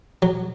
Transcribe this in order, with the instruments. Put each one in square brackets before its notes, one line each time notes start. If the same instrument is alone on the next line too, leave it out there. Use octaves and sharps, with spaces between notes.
[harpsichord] F#3